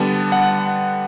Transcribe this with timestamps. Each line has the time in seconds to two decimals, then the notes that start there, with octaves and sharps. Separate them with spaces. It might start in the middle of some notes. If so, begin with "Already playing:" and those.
Already playing: D3 G3 B3 A5
0.32 F#5